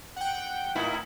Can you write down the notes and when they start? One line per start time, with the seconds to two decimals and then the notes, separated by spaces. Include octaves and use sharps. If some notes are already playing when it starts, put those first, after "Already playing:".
0.16 F#5 G5
0.75 A2 D#4 E4